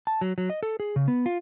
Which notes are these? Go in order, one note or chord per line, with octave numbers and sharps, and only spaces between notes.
A5
F#3
F#3
D#5
A4
G#4
C#3
B3
F4